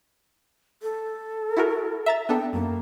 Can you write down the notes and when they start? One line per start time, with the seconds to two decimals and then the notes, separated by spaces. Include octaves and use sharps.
0.83 A4
1.57 E4 F#4 A#4
2.06 E5 A#5 A6
2.29 B3 D4 A4 G5
2.53 F#2 A#3